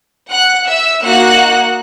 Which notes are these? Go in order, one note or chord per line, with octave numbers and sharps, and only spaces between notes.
F#5 F#6
E5 E6
A#3 D#4 F#4 F#5 F#6